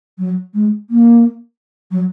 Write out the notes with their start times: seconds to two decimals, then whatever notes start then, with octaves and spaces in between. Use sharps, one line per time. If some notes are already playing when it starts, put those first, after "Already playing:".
0.18 F#3
0.54 G#3
0.90 A#3
1.91 F#3